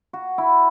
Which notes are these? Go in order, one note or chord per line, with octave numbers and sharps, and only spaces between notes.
F#4
E4